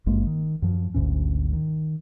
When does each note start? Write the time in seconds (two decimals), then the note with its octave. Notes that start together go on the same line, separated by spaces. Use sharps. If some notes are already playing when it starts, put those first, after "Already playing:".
0.06 G#1 G2 G#3 A#3
0.27 D#3
0.62 F#2 F3
0.94 G#1 D2 G#2 C#4
1.53 D#3